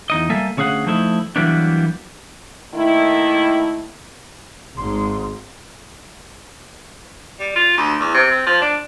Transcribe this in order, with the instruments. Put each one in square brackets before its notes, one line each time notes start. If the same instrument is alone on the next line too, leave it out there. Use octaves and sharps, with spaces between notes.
[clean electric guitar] E2 D#4 D#5
G3 A#3 A4 E5 G#5
D2 C#4 G#4 F5 F#5
F3 A3 D#4 E4
E3 F#3 G3 A#3 B3 D4
[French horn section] D#3 A3 A#3 E4
[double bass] G#1 G#2 [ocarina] C6
[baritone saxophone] G3
F4
D2
E2
C3
C4
F3
D4